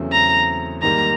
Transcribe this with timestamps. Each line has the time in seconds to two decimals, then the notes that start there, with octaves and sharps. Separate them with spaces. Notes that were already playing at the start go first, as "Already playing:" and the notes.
Already playing: E2 C#3 F#3 A3 C4
0.13 A#5
0.82 G#2 D#3 G3 A#3 A#5